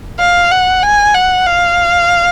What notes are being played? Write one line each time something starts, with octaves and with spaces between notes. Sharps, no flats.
F5
F#5
G#5
F#5
F5